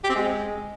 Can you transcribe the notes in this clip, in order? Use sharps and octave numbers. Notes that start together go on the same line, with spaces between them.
G4
C4
G#3